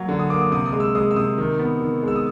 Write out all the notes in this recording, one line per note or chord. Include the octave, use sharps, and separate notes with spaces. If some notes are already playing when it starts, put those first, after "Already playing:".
Already playing: F#3 A#3
D3
D#6
A#3 D6
D#6
C3 D#6
D#6
G#3
E6
G#3 D#6
E6
C3 D#6
D#3
B3
D#3
G#3 E6
D#6